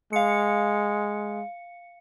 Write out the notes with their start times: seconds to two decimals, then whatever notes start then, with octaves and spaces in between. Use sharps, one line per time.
0.13 G#3 F5 C#7